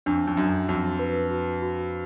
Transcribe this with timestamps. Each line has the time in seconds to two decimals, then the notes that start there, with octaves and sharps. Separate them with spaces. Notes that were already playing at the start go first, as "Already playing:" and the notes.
0.06 F2 D4
0.27 F2
0.37 F#2 D4
0.68 F2 F#4
0.99 B4
1.31 F#4
1.62 F#4